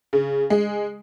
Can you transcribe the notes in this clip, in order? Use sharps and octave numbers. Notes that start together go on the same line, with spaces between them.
C#3
G#3